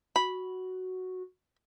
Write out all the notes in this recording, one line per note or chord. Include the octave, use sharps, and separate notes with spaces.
F#4 B5